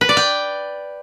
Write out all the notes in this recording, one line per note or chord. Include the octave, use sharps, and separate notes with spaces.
B4
D5
G5